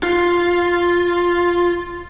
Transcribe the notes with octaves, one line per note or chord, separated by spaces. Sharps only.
F4